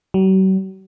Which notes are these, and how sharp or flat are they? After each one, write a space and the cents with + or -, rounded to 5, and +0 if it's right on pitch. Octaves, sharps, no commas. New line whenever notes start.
F#3 +45